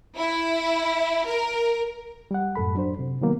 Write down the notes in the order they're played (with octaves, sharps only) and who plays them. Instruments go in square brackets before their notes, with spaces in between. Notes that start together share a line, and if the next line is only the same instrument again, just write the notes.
[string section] E4
A#4
[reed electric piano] G3 F#5
F#2 A2 A4 B5
F#3 D4 C5
C3
D#3 F#3 A#3 B3